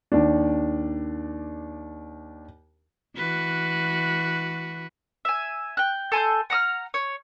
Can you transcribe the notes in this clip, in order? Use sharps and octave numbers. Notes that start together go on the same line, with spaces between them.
D#2 D4
E3 F#4 B4
E5 G#5
G5 F#6
A4 G#5 C6 G6
F#5 A#5 D#6 F6
C#5